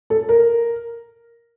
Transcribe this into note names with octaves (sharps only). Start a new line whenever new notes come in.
A4
A#4